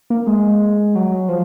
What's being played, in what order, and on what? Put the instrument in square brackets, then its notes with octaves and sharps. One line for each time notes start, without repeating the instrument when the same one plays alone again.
[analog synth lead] A#3
G#3
F#3
F3